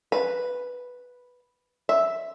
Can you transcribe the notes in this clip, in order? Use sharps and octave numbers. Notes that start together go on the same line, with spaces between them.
B4
E5